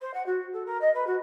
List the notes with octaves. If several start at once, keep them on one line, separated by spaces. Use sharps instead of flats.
C5
F#5
F#4
A4
A#4
D#5
B4
F#4